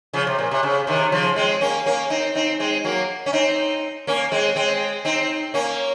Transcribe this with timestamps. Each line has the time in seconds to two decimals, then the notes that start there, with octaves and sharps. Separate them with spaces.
0.13 C#3 F3
0.27 C3
0.39 A#2
0.51 C3
0.63 C#3
0.87 C3 D#3
1.12 C#3 F3
1.36 G#3 C4
1.61 A#3 C#4
1.86 A#3 C#4
2.10 C4 D#4
2.35 C4 D#4
2.60 G#3 C4
2.84 F#3 A#3
3.26 C#4
3.33 C4 D#4
4.07 A#3 C#4
4.32 G#3 C4
4.56 G#3 C4
5.05 C4 D#4
5.54 A#3 C#4